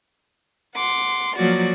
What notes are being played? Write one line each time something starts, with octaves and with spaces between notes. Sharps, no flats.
F#5 C6 D6
F3 F#3 A#3 F#4 D5